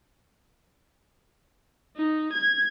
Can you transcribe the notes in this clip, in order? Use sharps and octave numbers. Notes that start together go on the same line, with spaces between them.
D#4
G#6